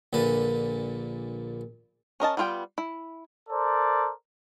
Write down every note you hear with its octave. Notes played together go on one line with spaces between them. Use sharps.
A#1 A#2 D3 B4 A5
C#4 A#4 D#5 A5
G3 B3 F4 C5 G5
E4
A4 A#4 C5 D5